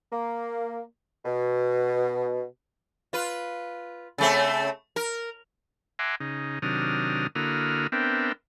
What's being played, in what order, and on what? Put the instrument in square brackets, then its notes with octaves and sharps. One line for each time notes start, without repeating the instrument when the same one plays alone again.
[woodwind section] A#3
B2
[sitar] F4 B4
C#3 A3 C4
A#4
[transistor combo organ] E5 F#5 G#5 A#5 C6 D6
C#3 D#4
C3 D#3 F#3 D4 D#6 F6
D3 A#3 E4 F#4 D#6 F6
B3 C4 D4 A#4 E5 G5